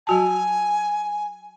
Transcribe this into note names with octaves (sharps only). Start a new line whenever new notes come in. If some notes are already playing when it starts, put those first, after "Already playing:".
F#3 F#4 G#5 A5